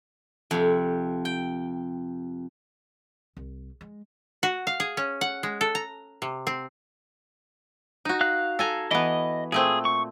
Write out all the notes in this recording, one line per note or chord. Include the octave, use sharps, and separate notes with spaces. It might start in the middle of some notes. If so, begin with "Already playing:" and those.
F2 C3
G5
C2
G#3
F#4
F5
G#4
C#4
F#5
G#3
A4
A#5
C3
C4
D#4 F#4
F5 F#6
A4 G#5 A#5
E3 B3 D#5
A#2 A3 C4 G#4
C#6